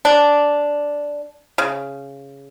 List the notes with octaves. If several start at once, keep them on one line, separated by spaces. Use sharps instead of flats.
D4
C#3